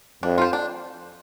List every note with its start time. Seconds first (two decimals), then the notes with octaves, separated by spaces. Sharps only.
0.23 F2 D4
0.38 F4 C5
0.53 D4